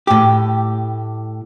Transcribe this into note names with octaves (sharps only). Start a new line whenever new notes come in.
A2 G4